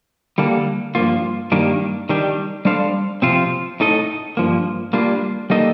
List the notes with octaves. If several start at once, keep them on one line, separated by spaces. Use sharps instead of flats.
D3 G3 A#3 D4 A4
G2 F3 A#3 F4
G2 D#3 G3 A#3 D4
D#3 G3 D4 G4
G3 D4 A4 C5 F5
C3 F3 C4 F4
A2 A3 D#4 A4 D#5
G2 F3 A#3
G3 A#3 D4 F4
G3 A#3 D#4 A4 D#5